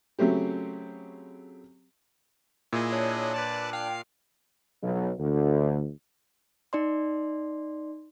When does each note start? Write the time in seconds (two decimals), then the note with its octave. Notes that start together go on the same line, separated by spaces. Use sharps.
0.19 C#3 F#3 A3 C4 G4
2.73 A#2 E4 G#4 D#5
2.92 D4 C#5 F#6
3.34 B4 D5 A5
3.73 F5 G5 C7
4.82 B1
5.19 D2
6.73 D#4 D5 C6